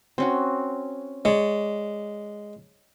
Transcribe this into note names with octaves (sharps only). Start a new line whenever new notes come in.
C4 C#4 F#4
G#3 C#5 D5